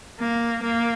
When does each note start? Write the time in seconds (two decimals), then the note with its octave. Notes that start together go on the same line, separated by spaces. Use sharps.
0.19 A#3
0.63 A#3